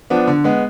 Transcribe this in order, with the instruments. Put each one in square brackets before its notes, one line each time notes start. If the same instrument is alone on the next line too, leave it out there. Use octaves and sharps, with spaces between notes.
[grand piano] F3 B3 D4
D3
G#3 B3